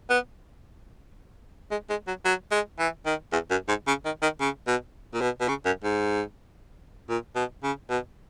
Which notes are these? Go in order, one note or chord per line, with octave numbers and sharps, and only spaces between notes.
B3
G#3
G#3
F#3
F#3
G#3
E3
D#3
E2
F#2
G#2
C#3
D#3
D#3
C#3
B2
A#2
B2
B2
C#3
F#2
G#2
A#2
B2
C#3
B2